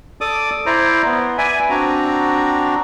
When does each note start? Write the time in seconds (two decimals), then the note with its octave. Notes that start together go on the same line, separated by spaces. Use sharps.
0.21 A4 D5 D6 D#6
0.66 E4 C5 D5 A#5
1.06 B3
1.38 B4 D5 E5 G#5
1.70 C4 D4 F#4 A#5